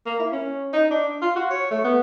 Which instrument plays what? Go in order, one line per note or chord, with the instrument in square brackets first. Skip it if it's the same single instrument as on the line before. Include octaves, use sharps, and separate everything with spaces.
[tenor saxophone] A#3
E4
C#4
D#4
D4
F4
F#4
C#5
A3
B3